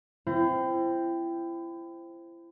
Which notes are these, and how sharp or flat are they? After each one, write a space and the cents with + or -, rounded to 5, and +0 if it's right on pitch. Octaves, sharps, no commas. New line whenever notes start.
C4 +0 E4 +35